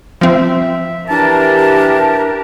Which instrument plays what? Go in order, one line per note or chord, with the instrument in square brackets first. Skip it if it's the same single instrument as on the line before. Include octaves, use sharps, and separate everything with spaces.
[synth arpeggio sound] F3 C4 [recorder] E5
[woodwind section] E3 A5 [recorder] D4 [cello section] G4 A#4